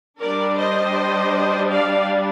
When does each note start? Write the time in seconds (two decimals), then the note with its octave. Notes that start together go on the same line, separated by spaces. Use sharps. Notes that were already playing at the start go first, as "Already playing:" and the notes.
0.20 G3 D4 A#4 D5
0.59 C5 D#5
1.71 D5 F5